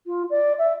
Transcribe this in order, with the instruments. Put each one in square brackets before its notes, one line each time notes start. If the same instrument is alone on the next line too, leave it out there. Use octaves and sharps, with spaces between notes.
[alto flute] F4
D5
E5